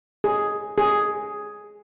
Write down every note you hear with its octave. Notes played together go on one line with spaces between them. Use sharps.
G#4
G#4